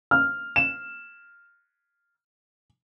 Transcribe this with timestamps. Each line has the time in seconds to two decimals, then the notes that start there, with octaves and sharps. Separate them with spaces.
0.11 F6
0.56 E7